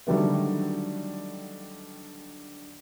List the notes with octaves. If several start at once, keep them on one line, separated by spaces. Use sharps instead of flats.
D3 D#3 F#3 G3 A3 B3